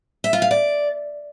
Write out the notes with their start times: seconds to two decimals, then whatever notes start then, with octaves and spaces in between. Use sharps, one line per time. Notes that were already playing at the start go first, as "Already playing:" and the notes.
0.24 E5
0.33 F4
0.42 F5
0.51 D5